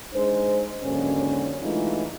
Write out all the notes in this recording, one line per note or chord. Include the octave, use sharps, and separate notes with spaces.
G#3 D4 D#4 C5
D#2 G#2 D3 F#3 C#4
E3 G#3 A3 D4 D#4 F4